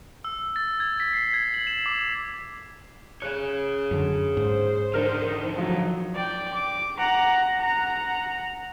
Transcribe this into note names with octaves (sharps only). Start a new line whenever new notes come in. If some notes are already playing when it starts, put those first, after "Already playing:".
E6
A6
G#6
B6
C7
G#6
F#7
E7
D6
G#4 C#5 F#6
F#2 D3
G#2 C5
D3 D4 D#4 A#4 F6
F3 F#3
D5 G5
D6
F#5 A#5
F#5 A#5